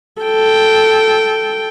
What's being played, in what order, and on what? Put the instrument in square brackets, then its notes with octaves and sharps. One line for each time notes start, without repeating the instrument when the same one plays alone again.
[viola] A4 G5